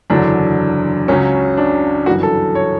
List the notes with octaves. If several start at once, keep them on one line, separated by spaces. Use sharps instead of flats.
F#1 E2 D3 F#3 D4
C#2 C#3 F#3 C#4
D4
G1 F#2 E3 F#4
A4
C#5